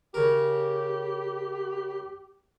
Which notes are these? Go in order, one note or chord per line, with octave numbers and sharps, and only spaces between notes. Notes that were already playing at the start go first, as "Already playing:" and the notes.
C#3 G4 A#4